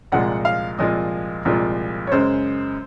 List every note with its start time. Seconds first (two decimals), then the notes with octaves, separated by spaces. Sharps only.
0.12 C2 A#2 F3 G#3 F#5
0.45 F5
0.78 C2 A#2 F3 G#3 D#5
1.45 C2 A#2 F3 G#3
2.07 C#5
2.12 F#2 C#3 G#3 C5